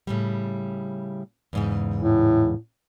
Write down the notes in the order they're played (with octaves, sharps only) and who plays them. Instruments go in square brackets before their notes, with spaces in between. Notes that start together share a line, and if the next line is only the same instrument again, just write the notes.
[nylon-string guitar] A2 C#3 G3
E2 G#2 C#3
[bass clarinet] A2